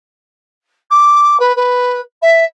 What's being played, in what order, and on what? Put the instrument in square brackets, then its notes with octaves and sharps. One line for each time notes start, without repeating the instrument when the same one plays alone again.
[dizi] D6
B4
B4
E5